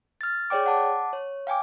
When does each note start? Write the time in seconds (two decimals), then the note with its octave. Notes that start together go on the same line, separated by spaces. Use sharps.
0.21 F6 A6
0.50 G#4 C#5 D5 G5 D6
0.66 F#5 A5 D6
1.13 C#5
1.47 F5 G5 G#5 D6